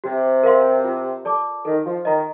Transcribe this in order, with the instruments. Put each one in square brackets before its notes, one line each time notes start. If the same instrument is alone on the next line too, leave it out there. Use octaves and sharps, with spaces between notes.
[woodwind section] C3 [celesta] G4
[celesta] A#4 F5 C6
F4
A4 D5 A5 D6
[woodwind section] D#3 [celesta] A4
[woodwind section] F3
[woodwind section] D#3 [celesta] D#5 A#5